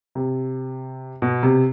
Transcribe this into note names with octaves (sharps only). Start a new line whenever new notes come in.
C3
B2
C3